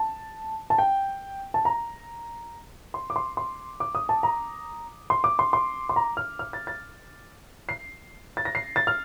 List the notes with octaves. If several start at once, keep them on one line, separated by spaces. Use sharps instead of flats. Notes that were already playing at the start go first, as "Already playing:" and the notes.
Already playing: A5
A5
G5
A5
A#5
C6
D6
C6
C6
D6
D#6
A5
A#5
C6
D6
C6
C6
C6
A#5
F6
F6
A6
A6
C7
A6
A#6
C7
A6
F6